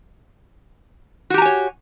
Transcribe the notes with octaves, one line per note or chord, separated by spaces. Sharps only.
F#4 G4 C#5 G#5 A#5